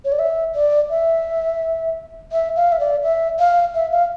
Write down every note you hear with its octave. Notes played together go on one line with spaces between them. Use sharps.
C#5
D5
E5
D5
E5
E5
F5
E5
D5
E5
F5
E5
F5